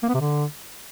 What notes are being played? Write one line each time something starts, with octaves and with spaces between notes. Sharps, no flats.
A#3
B3
C3
D3